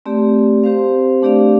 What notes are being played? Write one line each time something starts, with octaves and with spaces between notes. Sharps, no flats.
A3 C4 G4 D5
C4 G4 C5 F5
A3 D4 G4 D5 F5